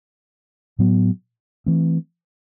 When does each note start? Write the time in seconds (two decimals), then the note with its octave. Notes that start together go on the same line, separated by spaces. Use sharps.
0.79 A2 F#3 B3
1.66 E3 A3 C4